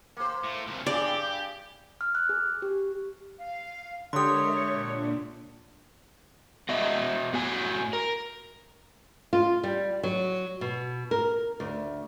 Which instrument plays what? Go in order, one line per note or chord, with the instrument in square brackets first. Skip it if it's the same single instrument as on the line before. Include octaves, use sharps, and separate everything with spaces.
[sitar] A#3 C5
[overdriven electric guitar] A2
C2 A#2
[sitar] G2 G#4 [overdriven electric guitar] G4 [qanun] D5
[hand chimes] F6
F#6
G#4
G4
[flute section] F5
[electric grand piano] D3 G4 [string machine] G#3 A#4 E5 [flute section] C#5 [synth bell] C6 D#6
[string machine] A#2 D4
[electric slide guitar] B3 F#4 D#5 E5
A2 F#4 G#5
A#4
[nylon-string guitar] F4
G3
F#3
B2
A#4
D2